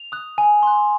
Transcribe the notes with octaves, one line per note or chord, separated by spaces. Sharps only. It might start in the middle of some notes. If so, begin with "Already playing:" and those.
Already playing: F7
D#6 F#6
G#5
C6 F#6